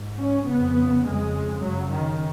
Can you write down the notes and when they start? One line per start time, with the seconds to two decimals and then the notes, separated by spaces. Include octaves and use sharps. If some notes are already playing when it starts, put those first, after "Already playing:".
Already playing: G#2
0.19 C#4
0.47 F2 C#3 B3
1.05 F2 C#3 G#3
1.62 F#2 C#3 F#3
1.91 D#3